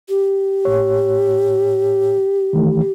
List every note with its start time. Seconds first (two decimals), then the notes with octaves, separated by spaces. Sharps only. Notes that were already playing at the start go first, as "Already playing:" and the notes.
0.09 G4
0.65 A2 C#5
2.53 D#3 E3 A3